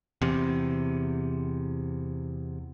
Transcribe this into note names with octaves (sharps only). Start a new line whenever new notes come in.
E2 C3